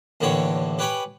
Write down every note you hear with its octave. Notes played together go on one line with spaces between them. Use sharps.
D#2 A2 D3 E3 G4 C#5
G4 B4 C#5 G5 G#5 B5